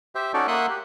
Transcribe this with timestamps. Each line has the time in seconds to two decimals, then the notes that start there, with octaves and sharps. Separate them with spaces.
0.15 G4 C5 E5
0.34 C#4 D#4 F#4 A4 D5
0.48 A#3 E5 F#5 C6 D#6 F#6
0.70 G4